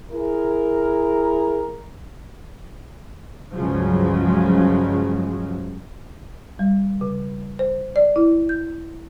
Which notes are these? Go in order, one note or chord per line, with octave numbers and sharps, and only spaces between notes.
E4 G#4 A#4
C#2 G2 C#3 F3 F#3 G#3
G3
C#3
C5
D5
E4
G6